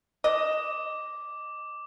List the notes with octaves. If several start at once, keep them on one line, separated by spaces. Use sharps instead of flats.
D#5 D6